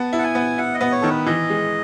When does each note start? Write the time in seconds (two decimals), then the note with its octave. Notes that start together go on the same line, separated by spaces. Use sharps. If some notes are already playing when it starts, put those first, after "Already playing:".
Already playing: B3 A5
0.13 E4
0.19 F#5
0.24 G#5
0.35 B3
0.58 E4 F#5
0.74 D#5
0.81 B3
0.92 C#5
1.02 D#3 A4
1.10 B4
1.26 E3 D#5
1.50 G#3